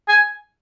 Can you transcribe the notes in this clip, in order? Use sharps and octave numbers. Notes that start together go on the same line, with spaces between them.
G#5